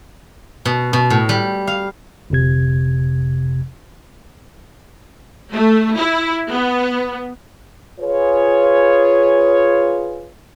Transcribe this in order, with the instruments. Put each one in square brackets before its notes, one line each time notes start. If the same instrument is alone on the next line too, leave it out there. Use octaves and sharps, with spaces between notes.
[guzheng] B2
B2
A2
G3
F5
[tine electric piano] G1 F2 C3 G#6
[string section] A3
E4
B3
[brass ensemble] F4 G#4 B4 C#5